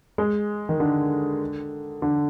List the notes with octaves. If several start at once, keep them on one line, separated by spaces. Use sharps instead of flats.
G#3
D#3
D3
D3